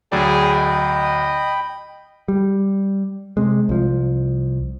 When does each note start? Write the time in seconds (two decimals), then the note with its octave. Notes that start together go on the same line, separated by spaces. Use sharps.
0.12 D2 F#3 G#4 D5 G5 B5
0.57 D#5
2.28 G3
3.37 C3 G#3
3.69 C2 F3